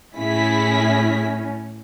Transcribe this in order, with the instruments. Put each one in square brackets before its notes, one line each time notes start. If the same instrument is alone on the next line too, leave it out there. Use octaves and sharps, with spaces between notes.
[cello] A2 C#4 [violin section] E4 G#4 B6